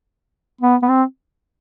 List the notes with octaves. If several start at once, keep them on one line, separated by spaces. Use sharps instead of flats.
B3
B3
C4